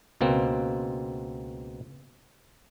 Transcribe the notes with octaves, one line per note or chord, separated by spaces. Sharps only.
C#2 B2 A#3 C4